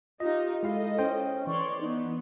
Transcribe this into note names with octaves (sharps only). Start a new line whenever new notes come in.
D#4 F4 G4 D#5
G#3 E4 A4 D#5 F5
C#4 C5 G5
E3 C#5 D5 C6 C#6
B3 D#4